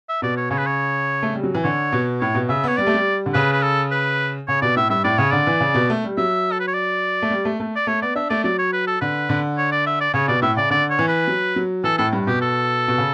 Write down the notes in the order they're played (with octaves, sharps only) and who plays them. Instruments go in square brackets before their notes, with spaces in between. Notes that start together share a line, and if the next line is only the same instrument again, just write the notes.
[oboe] E5
[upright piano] B2 [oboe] D5
[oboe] C#5
[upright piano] C#3 [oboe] C#5
[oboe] B4
C#5
[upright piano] A3
G3
F#3
E3
[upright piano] D3 [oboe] C#5
[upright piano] B2
[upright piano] A2 [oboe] C#5
[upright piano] B2
[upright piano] C#3 [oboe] E5
[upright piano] B3 [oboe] C#5
[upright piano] G3 [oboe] D5
[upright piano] A3
G3
D3
[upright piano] C#3 [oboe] B4
[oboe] B4
A4
B4
[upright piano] C#3 [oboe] C#5
[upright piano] B2 [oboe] D5
[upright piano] A2 [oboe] E5
[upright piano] G2 [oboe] E5
[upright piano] A2 [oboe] D5
[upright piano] C#3 [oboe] C#5
[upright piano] D3 [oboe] D5
[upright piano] E3
C#3
B2
A3
G3
[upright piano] F#3 [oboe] E5
[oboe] A4
B4
C#5
D5
[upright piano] A3
G3
A3
A3
[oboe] D5
[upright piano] A3 [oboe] C#5
[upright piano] B3 [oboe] D5
[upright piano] D4 [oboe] E5
[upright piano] A3 [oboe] D5
[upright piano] F#3 [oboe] D5
[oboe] C#5
B4
A4
[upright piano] D3 [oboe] B4
[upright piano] D3
[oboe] C#5
D5
E5
D5
[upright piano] C#3 [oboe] C#5
[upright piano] B2 [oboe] D5
[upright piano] A2 [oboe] E5
[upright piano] C#3 [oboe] D5
[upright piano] D3 [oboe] D5
[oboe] C#5
[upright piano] E3
[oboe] B4
[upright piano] F#3
F#3
[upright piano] E3 [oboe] A4
[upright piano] A2 [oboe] A4
[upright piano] G2
[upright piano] B2 [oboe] G4
[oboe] A4
[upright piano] B2
C#3